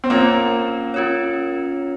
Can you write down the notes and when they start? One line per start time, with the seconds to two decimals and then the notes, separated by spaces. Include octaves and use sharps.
0.04 C4
0.10 A#3 C#4 F4 A#4 C#5
0.94 C#4 F4 A#4 C#5